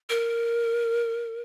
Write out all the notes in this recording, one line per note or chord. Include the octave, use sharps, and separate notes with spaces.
A#4